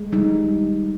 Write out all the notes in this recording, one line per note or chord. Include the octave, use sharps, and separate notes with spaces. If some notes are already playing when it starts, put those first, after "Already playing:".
Already playing: G#3
G3 D#4